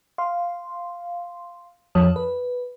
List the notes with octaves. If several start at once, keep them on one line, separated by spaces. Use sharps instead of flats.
F5 C6
F2 F3 C#5 A5 D#6
B4